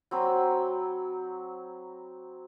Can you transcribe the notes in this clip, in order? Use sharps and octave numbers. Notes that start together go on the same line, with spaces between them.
F#3 C4 B5